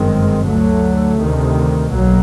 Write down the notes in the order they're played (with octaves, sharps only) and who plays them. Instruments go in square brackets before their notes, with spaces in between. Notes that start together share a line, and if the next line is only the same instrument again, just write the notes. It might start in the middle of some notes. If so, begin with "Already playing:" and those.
Already playing: [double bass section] G1 F#2 D#3 G#3 C4
D2 D3 F#3 A3
D2 C3 D#3
B1 B2 F#3 A#3